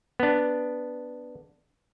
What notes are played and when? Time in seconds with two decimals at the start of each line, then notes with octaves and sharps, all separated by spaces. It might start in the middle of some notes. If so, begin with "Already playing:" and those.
0.20 B3 D4